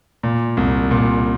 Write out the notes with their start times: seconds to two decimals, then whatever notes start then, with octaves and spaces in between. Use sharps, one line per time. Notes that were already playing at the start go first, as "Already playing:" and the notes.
0.23 A#2
0.57 C2
0.91 A#2